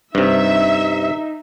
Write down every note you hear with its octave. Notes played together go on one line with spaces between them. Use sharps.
G2 C3 D#4 E5